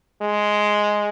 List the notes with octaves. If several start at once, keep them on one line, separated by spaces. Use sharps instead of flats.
G#3